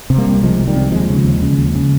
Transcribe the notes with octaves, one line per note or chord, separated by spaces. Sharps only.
C3
G3 A#3
C2
C3 F3 G#3
C2
D#3 G3
C3
D#2 F3 G#3
C#3
D#2
C#3
D#2
C#3